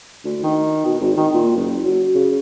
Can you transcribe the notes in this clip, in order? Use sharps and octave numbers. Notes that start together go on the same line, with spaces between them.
D2
D#3
B2
G#1
D#3
A#2
F#1
F#3
C#3